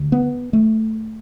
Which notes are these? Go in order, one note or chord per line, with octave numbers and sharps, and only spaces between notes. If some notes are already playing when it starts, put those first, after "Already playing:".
Already playing: D2 D3
B3
A3